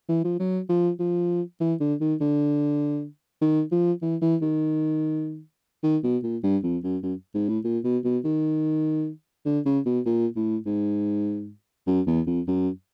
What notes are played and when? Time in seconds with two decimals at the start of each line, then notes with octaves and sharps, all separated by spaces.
0.09 E3
0.25 F3
0.40 F#3
0.69 F3
0.99 F3
1.60 E3
1.80 D3
2.01 D#3
2.21 D3
3.41 D#3
3.71 F3
4.02 E3
4.22 E3
4.42 D#3
5.83 D#3
6.04 B2
6.23 A#2
6.43 G2
6.63 F2
6.84 F#2
7.03 F#2
7.35 G#2
7.49 A2
7.64 A#2
7.84 B2
8.04 B2
8.25 D#3
9.46 D3
9.65 C#3
9.86 B2
10.06 A#2
10.36 A2
10.66 G#2
11.87 F#2
12.07 E2
12.27 F2
12.48 F#2